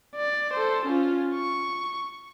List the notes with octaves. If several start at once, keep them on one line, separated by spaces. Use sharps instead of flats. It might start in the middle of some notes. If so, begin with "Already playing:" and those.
D5
A4 C5
C#4 F4
C#6